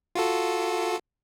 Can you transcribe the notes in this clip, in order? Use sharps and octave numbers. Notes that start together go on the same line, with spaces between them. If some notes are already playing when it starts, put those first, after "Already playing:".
F4 F#4 A4